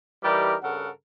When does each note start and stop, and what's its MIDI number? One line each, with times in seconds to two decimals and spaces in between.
0.23 0.55 52
0.23 0.55 55
0.23 0.55 63
0.23 0.55 67
0.23 0.55 70
0.23 0.55 74
0.62 0.88 43
0.62 0.88 49
0.62 0.88 69
0.62 0.88 70
0.62 0.88 78